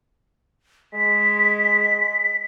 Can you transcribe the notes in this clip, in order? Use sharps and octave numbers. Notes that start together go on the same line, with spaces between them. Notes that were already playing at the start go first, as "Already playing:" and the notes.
G#3 B6